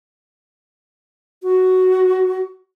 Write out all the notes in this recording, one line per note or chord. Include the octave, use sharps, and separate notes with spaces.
F#4